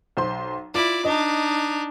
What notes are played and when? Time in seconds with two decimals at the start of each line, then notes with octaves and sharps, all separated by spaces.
0.17 B1 C5 C6
0.75 E4 F4 D5
1.05 D4 D#4 D#5